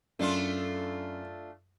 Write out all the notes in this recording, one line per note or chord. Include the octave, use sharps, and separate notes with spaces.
F#2 A3 D4 F4